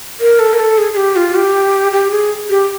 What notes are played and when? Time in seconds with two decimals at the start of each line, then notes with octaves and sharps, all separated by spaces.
0.21 A#4
0.39 A4
0.53 A#4
0.59 A4
0.78 G#4
0.93 G#4
0.97 G4
1.16 F4
1.35 G4
1.92 G4
2.11 G#4
2.50 G4